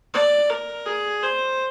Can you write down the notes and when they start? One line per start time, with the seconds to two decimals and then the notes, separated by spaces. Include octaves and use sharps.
0.14 D5
0.50 A#4
0.86 G#4
1.23 C5